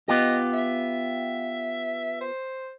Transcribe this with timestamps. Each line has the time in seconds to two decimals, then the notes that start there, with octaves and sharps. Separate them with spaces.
0.08 B3 F4 G4 D#5
0.54 E5
2.21 C5